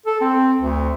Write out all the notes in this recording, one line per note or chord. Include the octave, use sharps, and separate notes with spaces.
A4
C4
D2